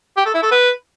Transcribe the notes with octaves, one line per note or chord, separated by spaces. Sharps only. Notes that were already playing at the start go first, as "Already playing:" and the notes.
G4
A4
E4
A4
B4